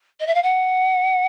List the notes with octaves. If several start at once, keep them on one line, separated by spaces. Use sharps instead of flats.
D#5
E5
F5
F#5